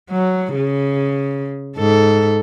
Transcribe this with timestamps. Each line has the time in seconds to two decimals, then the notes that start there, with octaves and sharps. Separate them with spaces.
0.11 F#3
0.55 C#3
1.77 G#2 A4